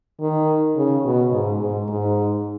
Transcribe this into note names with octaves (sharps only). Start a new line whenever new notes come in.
D#3
C#3
B2
G#2
G#2
G#2